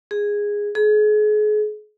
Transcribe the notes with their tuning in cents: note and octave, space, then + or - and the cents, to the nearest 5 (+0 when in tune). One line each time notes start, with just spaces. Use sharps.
G#4 -10
G#4 +35